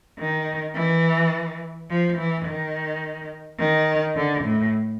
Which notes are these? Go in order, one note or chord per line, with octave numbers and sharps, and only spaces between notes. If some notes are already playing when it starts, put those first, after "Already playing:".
D#3
E3
F3
E3
D#3
D#3
D3
A2